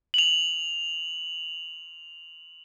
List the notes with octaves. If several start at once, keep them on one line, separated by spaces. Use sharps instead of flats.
F7 F#7